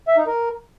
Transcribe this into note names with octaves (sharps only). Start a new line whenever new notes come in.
E5
D#4
A#4